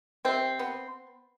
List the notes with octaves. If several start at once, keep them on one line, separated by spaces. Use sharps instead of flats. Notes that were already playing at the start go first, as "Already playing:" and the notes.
C3 C4
B3